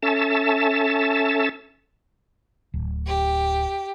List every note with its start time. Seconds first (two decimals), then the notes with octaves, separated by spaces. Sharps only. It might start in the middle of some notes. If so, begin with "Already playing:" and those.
0.03 C#4 A4 E5 A5
2.74 D1
3.07 G4